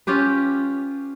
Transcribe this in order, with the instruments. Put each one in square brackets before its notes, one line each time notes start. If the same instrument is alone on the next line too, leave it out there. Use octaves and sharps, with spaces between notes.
[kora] C#4 F4 G4 B4